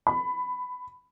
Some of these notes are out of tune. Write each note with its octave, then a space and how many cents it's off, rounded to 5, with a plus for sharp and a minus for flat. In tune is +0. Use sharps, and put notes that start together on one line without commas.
B5 +15